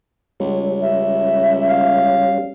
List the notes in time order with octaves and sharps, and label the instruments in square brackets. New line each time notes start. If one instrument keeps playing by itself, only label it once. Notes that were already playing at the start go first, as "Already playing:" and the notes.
[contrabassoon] C#2 [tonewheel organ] G3 C#4
[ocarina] E5
[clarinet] F5